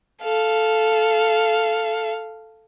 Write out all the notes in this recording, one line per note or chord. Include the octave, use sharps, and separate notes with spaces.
A4 F5